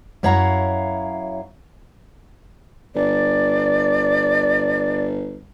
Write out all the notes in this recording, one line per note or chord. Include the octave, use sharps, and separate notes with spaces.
F#2 E4 C#5 F5 F#5 A#5
G1 D5